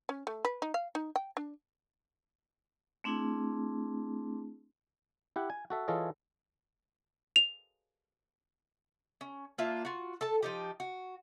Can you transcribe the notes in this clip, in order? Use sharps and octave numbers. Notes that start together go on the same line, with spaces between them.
C#4
A3
B4
D#4
F5
D#4
G5
D4
A3 C4 D4 E4 G#4
E4 G4 F#5
G#5
F#4 A4 E5
E3 F4 G#4 A4 C#5 D#5
F7
C#4
A#3 D4 F4 E5
F4 F#4
A4 A5
F3 D#4 G4
F#4